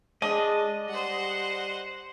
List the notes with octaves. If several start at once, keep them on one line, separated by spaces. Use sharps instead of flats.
G#3 D4 D#5
G3 C5 F#5